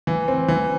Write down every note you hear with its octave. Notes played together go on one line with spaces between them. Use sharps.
E3
C4
E3